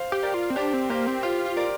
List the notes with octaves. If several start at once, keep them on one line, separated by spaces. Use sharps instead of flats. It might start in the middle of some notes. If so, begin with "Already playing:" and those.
Already playing: C5 F5
G4
A#4 D5
F4
C4
D4 G4 C5
C4
A#3 G4 C5
C4
F4 G4 C5
F4
A#4 D5